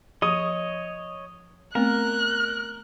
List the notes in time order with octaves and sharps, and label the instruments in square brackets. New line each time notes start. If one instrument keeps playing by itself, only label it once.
[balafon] F3 [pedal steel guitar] C#5 D#5 [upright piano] D#6
[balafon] A3 B3 C4 [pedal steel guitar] A#4 [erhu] F#6